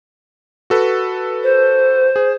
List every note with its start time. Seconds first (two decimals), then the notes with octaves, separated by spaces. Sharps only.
0.70 F#4 A4 B4
1.43 C5
2.16 G#4